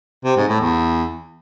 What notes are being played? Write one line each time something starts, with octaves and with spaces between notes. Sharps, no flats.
C3
G#2
A2
E2